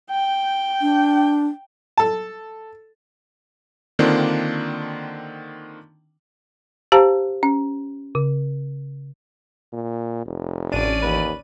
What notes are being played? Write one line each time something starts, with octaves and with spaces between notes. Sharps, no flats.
G5
D4
A4 A5
D3 D#3 A#3 C4 D4 F4
G4 C5 F5 A5 A#5
C#4
C#3
A#2
F1
A1 C#4 D4 D5 D#7
D#2 B4